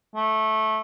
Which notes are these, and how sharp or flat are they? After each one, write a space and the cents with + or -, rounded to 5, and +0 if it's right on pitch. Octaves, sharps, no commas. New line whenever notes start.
A3 -10